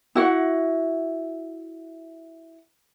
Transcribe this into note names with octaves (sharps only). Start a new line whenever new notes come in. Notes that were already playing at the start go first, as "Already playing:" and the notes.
E4 F#4 F#5